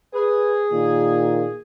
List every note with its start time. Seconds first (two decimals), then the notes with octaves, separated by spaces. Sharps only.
0.14 G#4 B4
0.72 A#2 D#3